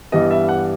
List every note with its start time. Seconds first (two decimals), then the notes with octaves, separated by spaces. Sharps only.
0.12 G2 E3 G3 B3 D#5
0.31 E5
0.49 F#5